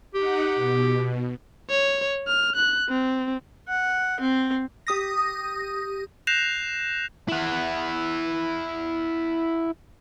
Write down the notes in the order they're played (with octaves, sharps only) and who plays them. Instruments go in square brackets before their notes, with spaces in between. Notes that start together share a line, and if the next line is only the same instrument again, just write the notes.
[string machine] D#4 F#5 [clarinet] G4
[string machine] B2
[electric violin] C#5
F6
F#6
C4
[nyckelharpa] F#5
C4
[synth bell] G4 D#6 A#6
[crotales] F#6 G6 A#6 C7 E7 F7
[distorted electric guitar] E4 F#5